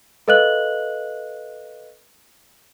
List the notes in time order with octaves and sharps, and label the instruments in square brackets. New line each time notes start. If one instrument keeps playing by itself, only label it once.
[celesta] A4 B4 D#5 F5 F#6 F#7